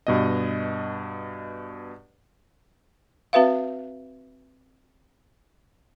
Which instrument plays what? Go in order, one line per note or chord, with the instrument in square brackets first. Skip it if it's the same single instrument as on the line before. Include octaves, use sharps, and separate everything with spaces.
[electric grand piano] G2 B2 D#5
[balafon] C4 F#4 B4 E5 F5